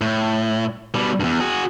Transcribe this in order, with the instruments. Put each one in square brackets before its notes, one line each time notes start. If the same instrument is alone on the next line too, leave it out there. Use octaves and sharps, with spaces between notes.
[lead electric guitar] A2
B2 G3
E2 G2
F#4 G#4